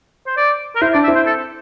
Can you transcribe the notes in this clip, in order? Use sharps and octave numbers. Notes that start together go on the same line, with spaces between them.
C5
D5
A#4
E4 C5
D4 D5
E5
C4 E4
C5
A4